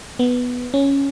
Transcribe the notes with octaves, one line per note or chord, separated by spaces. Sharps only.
B3
C#4